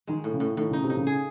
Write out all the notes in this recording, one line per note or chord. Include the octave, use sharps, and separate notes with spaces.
D#3 G#3
A2
C#3
A2
A2 D#3
C#3 D#4
C3
D#4
C#3
G#4